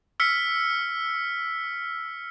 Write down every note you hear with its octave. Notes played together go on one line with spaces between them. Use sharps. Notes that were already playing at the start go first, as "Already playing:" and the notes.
E6 F6 B6 C#7